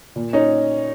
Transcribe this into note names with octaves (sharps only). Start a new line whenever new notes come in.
A#2
C#4 D#4